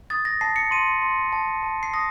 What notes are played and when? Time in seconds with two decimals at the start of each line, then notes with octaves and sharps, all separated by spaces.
0.10 D#6 A6
0.25 A#6
0.41 A5 C7
0.56 C#7
0.71 C6 D#7
1.02 C6
1.33 A5
1.63 A5
1.83 C7
1.94 D#6 A#6